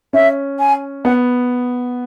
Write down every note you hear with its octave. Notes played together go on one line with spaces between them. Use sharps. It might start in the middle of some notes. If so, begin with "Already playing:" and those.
C#4 E5
G#5
B3 F#5